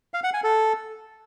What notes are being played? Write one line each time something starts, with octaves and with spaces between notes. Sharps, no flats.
F5
F#5
G#5
A4